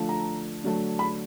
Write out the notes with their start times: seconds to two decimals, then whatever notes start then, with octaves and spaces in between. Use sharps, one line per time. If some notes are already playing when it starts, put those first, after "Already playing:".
Already playing: D3 F3 A3
0.09 A#5
0.64 D3 F#3 A3
0.99 B5